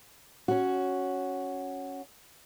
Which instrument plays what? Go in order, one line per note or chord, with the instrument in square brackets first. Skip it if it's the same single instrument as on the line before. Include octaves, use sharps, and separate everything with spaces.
[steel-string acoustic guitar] C#4 F#4